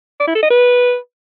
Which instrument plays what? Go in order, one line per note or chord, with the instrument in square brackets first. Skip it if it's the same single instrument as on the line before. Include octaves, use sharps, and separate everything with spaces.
[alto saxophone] D5
E4
A4
D#5
B4